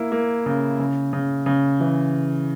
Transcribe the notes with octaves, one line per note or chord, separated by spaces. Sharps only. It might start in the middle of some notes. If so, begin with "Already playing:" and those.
Already playing: A#3 E4
A#3
C#3
C#3
C#3
C#3
E3